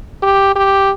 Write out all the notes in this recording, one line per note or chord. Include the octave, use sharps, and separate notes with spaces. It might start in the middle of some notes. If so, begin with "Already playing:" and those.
G4
G4